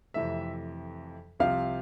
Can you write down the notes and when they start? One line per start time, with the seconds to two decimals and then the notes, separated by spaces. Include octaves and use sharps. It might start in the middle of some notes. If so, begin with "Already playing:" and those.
0.14 F2 C3 E3 A3 E5
1.40 C2 C3 F3 C4 F5